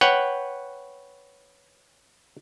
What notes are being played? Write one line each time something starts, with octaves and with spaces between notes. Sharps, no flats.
B4 C#5 F#5 G5